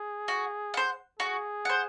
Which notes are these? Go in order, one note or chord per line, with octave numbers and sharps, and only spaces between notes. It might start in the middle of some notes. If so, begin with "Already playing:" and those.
Already playing: G#4
F#4
C5 F#5
F#4 G#4
C5 F#5